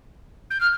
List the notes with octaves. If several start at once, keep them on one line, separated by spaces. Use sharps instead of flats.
G6
F6